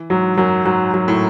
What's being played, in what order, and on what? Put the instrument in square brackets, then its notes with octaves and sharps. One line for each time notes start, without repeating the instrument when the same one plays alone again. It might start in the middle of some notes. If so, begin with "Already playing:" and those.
Already playing: [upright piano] E3
[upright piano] G#2 [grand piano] F#3
[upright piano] F#2 [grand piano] F#3
[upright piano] G#2 [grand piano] F#3
[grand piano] F#3
[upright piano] A2